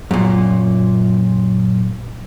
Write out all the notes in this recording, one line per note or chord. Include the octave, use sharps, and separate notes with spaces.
F#2 A#2